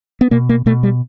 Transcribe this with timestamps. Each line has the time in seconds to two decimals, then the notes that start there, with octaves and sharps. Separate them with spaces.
0.21 B3
0.31 B2 A#3
0.49 A#3
0.66 B2 A3
0.83 G3